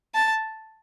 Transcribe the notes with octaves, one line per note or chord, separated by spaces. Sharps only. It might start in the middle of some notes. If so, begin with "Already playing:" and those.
A5